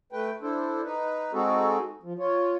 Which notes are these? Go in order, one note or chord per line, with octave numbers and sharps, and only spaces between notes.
A3 B4 G5
D4 E4 A4 C5
D#4 B4
G#3 C4 D#4 F#4 G#4 A4
F3
F4 C#5